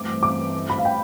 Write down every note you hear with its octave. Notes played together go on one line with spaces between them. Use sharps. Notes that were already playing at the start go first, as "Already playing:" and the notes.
Already playing: G2 E3 A3 C4 D6
D6
B5
F5
G5